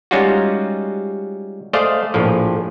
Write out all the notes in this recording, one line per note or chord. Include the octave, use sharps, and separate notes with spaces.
G3 G#3 C#4 D#4 F4 F#4
A3 G#4 C5 D5 D#5 F5
A#1 A2 F3